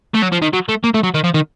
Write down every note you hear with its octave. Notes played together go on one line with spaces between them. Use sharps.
A3
F#3
F3
D#3
F#3
A3
A#3
A3
F#3
D#3
F3
D#3